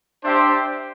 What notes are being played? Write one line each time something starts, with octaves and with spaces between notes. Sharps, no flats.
D4 G4 C5 E5 G5